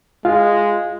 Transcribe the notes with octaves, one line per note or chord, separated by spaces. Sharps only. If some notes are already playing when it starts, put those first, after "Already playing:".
G#3 F4 F5